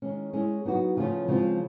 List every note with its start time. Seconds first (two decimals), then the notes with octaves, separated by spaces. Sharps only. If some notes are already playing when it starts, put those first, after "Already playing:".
0.02 D#3 G#3 C#4
0.33 G#3 C#4 E4 G#4
0.65 F#3 B3 D#4 F#4
0.96 C#3 F3 A3 C#4 F4
1.28 C#3 F3 G#3 C4 F4